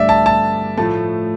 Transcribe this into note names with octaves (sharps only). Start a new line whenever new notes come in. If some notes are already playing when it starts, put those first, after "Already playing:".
Already playing: G2 D3 A3 D5 E5
A5
A5
A2 F3 A3 A5